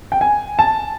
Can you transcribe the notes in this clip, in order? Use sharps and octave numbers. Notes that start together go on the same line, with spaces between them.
G5
G#5
A5